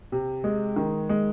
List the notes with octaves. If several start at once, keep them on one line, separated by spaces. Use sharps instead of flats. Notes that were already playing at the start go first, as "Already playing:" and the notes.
C3
G#3
D#3
G#3